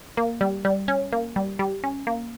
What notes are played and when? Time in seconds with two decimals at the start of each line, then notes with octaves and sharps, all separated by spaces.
0.17 A#3
0.41 G3
0.65 G3
0.88 C#4
1.13 A#3
1.36 G3
1.59 G3
1.84 C#4
2.07 A#3